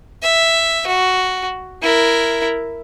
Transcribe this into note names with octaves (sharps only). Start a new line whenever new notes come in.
E5
F#4
E4 A#4